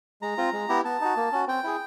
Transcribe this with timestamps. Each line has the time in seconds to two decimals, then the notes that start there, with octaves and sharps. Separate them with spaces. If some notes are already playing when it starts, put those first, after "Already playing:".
0.22 G#3 A#5
0.37 C4 F4
0.53 G#3
0.69 B3 E4 G4
0.85 B3 A5
1.01 D#4 F#4
1.16 A#3
1.32 C#4 F#4
1.47 C4 G5
1.64 E4 G#4